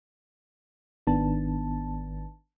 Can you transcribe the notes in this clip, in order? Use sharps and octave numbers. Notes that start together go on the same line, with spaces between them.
G#1 D#3 B3 D4 A5